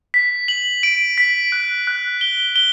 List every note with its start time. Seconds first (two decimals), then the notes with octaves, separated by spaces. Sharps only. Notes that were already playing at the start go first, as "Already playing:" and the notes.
0.14 B6
0.48 F#7
0.83 D7
1.18 B6
1.52 F#6
1.87 F#6
2.21 G7
2.56 G7